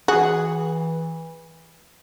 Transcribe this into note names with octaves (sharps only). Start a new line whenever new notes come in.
E3 F#4 G#4